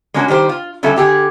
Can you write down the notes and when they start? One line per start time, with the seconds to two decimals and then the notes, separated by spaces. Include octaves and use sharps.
0.14 G#3 A#3 C#4 D4 F#4
0.28 D#3 G3 G4 C5
0.49 F4
0.83 D3 G3 C#4 F4 A4 E5
0.96 D3 G4 G#4